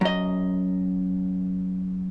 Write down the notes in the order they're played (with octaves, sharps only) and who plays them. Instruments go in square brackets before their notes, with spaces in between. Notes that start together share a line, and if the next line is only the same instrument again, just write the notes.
[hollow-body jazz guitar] F#2 D#5